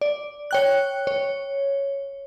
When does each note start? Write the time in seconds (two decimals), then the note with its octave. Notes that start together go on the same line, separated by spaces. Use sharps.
0.01 D5
0.51 C#5 G5 F#6
1.07 C#5